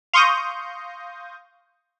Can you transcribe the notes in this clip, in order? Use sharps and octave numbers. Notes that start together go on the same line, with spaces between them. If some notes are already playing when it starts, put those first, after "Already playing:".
F5 C6 C#6 D#6 G6 A#6